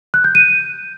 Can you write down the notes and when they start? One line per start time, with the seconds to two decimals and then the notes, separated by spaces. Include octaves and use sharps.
0.14 F#6
0.24 G6
0.35 D#7